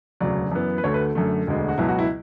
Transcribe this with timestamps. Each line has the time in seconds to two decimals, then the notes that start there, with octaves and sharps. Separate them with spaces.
0.20 E1 D2 C#3 F#3 D5
0.52 F#2 E3 B3
0.78 B4
0.84 D2 D3 A3 C#5
0.94 B4
1.15 F#2 D3 A3
1.47 E1 D2 D3 G#3
1.68 F#4
1.78 C#2 B2 F#3 B3 E4
1.89 F#4
1.99 E4